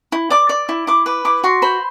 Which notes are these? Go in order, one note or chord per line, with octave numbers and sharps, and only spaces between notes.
E4
D5 D6
D5
E4
E4 D6
B4 D6
E4 D6
F#4 C6
C5 B5